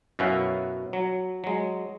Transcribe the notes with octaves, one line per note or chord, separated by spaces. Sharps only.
F#2 B2 C#4 E4 F5 F#5
F#3
F#3 G#3